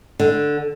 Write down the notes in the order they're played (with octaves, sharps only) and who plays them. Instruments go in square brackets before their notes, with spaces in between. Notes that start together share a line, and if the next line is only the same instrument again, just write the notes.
[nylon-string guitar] D3